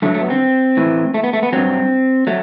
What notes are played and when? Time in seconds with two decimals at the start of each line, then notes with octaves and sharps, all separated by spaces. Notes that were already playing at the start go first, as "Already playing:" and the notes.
0.02 G2 D3 F#3 A3
0.14 A3
0.21 B3
0.30 C4
0.77 A2 E3
1.14 A3
1.24 B3
1.33 A3
1.43 B3
1.53 G2 F#3 C4
2.27 F#3 A3